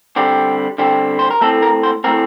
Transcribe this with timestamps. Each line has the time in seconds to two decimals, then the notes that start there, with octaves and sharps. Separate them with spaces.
0.16 D3 G3 C4 G4
0.78 D3 G3 C4
1.19 C5
1.31 A#4
1.41 A2 A3 C4 A4
1.62 A#4
1.83 C5
2.04 A2 A3 C4 A#4